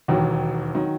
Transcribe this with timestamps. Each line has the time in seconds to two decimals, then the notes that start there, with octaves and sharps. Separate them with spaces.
0.08 E1 D#2 D#3 F#3
0.75 D#3 F#3